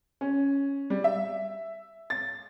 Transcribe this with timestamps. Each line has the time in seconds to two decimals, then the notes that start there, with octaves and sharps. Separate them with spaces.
0.21 C#4
0.90 G3
1.04 E5
2.10 A6